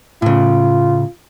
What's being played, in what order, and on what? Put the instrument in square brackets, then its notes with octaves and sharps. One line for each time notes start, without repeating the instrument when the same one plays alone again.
[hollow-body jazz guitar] A2 C#3 [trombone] F4